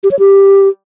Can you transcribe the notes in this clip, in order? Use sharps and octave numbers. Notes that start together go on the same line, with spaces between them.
G4
C#5
G4